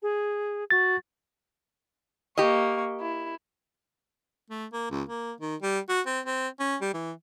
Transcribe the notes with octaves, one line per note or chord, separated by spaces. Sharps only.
G#4
F#4 A6
A#3 G4 D#5 C#6
E4
A3
A#3
C#2
A#3
D#3
G3
F#4
C4
C4
C#4
G3
E3